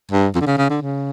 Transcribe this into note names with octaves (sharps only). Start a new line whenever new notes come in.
G2
F2
D3
C#3
C#3
D3
C#3